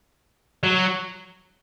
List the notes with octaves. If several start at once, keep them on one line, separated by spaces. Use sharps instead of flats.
F#3